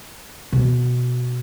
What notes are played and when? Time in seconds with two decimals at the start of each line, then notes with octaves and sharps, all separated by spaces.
0.52 B2